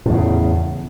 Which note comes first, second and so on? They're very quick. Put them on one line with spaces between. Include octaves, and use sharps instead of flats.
A2 E2 C#3